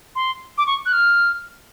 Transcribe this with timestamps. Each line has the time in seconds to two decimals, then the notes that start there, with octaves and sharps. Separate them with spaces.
0.16 C6
0.58 D6
0.67 C#6
0.86 F#6
0.93 F6